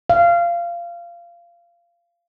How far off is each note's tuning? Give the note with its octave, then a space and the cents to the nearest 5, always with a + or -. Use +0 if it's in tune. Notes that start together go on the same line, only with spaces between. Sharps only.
F5 -20